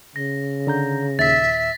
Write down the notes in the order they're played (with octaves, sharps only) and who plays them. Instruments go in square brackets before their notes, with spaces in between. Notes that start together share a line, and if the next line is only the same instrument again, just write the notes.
[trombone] C#3 [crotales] A#6
[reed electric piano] D3 A#5 G6
[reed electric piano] D#2 A#2 [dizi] E5 [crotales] A6 B6